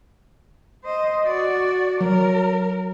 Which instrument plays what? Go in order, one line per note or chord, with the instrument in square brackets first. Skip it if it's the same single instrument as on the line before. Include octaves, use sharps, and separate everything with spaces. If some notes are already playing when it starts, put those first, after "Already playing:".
[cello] C5 D#5
F#4 D5
[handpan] F#3 [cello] A#4